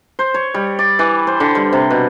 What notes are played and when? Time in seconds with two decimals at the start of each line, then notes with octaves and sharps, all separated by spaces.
0.19 C5
0.34 C#5
0.54 G3
0.79 D5
0.99 E3
1.27 C5
1.40 D3
1.55 G3
1.73 C3
1.90 B2